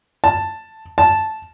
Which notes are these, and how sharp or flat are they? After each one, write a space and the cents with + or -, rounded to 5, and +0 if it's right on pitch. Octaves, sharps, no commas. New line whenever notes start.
A5 +0
A5 -10